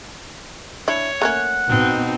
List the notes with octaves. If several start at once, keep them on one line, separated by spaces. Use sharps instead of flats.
D4 E4 C#5
A3 A#3 C#4 F#5
B2 C4 D#4